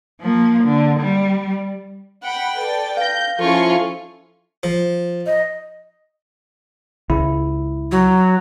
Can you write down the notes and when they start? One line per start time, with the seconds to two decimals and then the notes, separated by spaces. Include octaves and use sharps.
0.21 F3 A#3
0.64 D3
1.00 G3
2.24 F#5 G5 B5
2.58 A4 B4 D5
2.97 F5 G6 A#6
3.40 F3 C#4 E4 F4 A4 G#5 C6 C#6
4.63 F3
5.26 D#5
7.10 C#2 E4
7.91 F#3